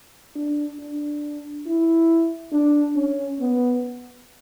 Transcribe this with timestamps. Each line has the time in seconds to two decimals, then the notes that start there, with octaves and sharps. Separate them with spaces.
0.36 D4
0.80 D4
1.67 E4
2.53 D4
2.96 C#4
3.40 B3